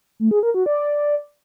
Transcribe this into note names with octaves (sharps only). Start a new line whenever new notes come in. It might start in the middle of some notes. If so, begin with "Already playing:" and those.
A3
G#4
A#4
F#4
D5